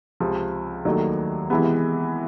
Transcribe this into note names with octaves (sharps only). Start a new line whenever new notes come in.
C#2 C3 F3
D#2 D#3 F#3 A3 D4
C3 E3 G#3 B3